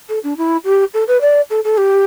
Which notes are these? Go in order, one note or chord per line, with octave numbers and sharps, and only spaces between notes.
A4
D4
E4
G4
A4
B4
D5
A4
A4
G4